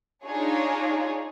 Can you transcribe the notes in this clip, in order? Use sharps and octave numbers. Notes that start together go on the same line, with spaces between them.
D4 D#4 F4 G#4 C#5